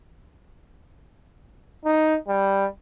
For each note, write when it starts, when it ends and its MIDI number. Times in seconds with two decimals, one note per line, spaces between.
1.85 2.16 63
2.28 2.66 55